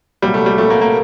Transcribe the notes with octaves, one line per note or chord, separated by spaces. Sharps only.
C2 A#2 F#3 G3
A3
G3
C2 A#2 F#3 A3
A#3
A#3